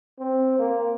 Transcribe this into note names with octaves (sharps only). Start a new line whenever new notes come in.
C4
A#3